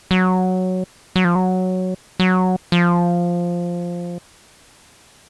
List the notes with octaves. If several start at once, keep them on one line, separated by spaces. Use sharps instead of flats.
F#3
F#3
F3
F#3
F#3
F3